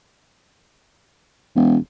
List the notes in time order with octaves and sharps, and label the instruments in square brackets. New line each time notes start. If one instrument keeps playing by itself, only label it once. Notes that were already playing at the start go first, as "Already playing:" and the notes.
[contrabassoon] E1